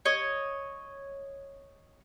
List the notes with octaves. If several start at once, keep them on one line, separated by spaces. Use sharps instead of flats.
C#5 D#5